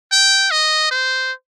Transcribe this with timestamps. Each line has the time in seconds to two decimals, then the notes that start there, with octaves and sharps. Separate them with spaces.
0.12 G5
0.51 D#5
0.91 C5